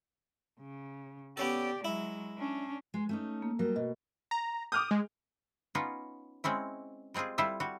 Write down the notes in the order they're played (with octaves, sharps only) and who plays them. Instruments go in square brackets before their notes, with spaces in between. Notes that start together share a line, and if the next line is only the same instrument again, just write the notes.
[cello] C#3
[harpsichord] B3 C#4 A4 [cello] G4 D5
[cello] F#3 G#3 [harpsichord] E4
[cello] C#4 D4
[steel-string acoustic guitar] G#3
A3 C#4 D#4
[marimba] A#3
[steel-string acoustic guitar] F#3 G3 [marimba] A#4
[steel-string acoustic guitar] B2 [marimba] D#5
[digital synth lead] A#5
[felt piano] D6 F6 G6 [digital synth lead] D#6
[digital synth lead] G#3
[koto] B3 C#4 D#4 F4
G#3 C4 C#4 E4
G3 G#3 C4 F4 G#4
G3 E4 F4 A4 C5 E5
G3 F#4